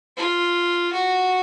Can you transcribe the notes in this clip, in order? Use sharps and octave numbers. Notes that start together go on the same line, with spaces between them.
F4
F#4